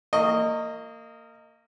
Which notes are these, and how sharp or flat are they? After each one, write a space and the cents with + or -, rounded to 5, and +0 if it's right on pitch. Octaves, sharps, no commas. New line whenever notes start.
A#3 -25 D#5 +0 C#6 +0